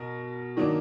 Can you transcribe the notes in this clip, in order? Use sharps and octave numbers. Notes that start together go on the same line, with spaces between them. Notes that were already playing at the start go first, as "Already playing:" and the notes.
Already playing: B2 A#4
D#3 F#3 A#3 D4